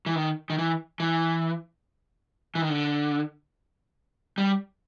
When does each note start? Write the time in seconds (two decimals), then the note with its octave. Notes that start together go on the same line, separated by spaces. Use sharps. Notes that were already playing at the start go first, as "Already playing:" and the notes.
0.06 E3
0.16 D#3
0.50 D#3
0.58 E3
1.00 E3
2.55 E3
2.62 D#3
2.70 D3
4.38 G3